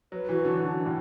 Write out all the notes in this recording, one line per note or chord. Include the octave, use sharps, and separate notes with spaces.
F#3 B4
E3 F#4
D3 D4
D3 D4
D4
A2